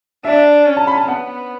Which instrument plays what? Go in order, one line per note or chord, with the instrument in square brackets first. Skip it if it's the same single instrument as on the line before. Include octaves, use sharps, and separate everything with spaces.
[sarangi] D4 [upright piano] E5
[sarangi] C#4
[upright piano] A5
B5
A5
[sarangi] B3 [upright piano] F#5